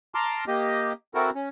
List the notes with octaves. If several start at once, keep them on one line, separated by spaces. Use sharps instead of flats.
A5 A#5 C6 D6 F6
A#3 G4 D#5
C4 E4 F#4 A4 A#4
C#4